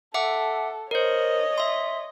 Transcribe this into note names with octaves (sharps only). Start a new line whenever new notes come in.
A4 E5 F#5 D6
A#4 C5 C#5 D#5
E5 C6